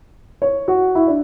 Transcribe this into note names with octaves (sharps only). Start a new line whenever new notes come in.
C#5
F#4
E4
D4